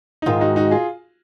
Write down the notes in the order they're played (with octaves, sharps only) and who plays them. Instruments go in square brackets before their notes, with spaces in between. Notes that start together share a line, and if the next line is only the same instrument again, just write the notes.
[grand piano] D#4
[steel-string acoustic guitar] G#2 D#3 G#3 [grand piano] F4
[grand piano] D#4 F#4
D#4 F#4
F4 G#4